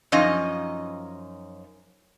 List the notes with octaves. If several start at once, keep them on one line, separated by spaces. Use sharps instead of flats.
F#2 F3 C#4 D#4 D#5